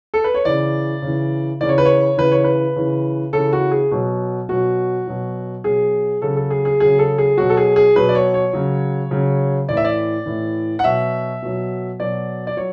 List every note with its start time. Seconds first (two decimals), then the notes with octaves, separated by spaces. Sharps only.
0.14 A4
0.24 B4
0.34 C#5
0.45 C#3 E3 D5
1.02 C#3 E3
1.61 C#3 E3 D5
1.69 C#5
1.78 B4
1.85 C#5
2.17 C#3 E3 B4
2.31 C#5
2.44 B4
2.76 C#3 E3
3.33 C#3 E3 A4
3.53 F#4
3.71 G#4
3.91 B2 F#3
4.49 B2 F#3 F#4
5.07 B2 F#3
5.64 B2 F#3 G#4
6.22 C#3 F#3 A4
6.37 A4
6.50 G#4
6.65 G#4
6.80 C#3 F#3 G#4
6.99 A4
7.18 G#4
7.37 B2 F#3 F#4
7.49 A4
7.57 G#4
7.76 G#4
7.95 B2 F#3 B4
8.09 D5
8.15 C#5
8.34 C#5
8.53 C#3 F#3
9.11 C#3 F#3
9.69 A2 E3 D5
9.77 E5
9.84 D5
10.26 A2 E3
10.79 F#5
10.84 B2 F#3 E5
11.42 B2 F#3
12.00 B2 F#3 D5
12.47 D5
12.57 F#3 C#5